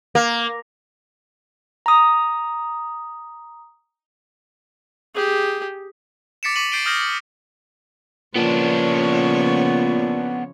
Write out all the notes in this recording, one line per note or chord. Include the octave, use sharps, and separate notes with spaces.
A#3
A#5 D#6
G4 G#4
D6 A6 B6 C#7 D7 E7
C#6 D6 B6 D#7 E7 F#7
G6 A6 C7 D7 D#7 G7
D#6 F6 G6 A#6 E7 F#7
F#7
A#2 C#3 F3 B3 D4 C#5